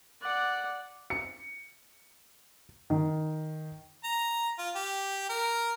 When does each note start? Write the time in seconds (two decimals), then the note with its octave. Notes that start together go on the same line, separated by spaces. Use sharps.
0.21 D5 F#5
1.10 C#7
2.90 D#3
4.04 A#5
4.58 F4
4.76 G4
5.30 A#4